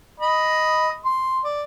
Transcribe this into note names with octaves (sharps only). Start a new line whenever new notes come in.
D#5 B5
C6
D5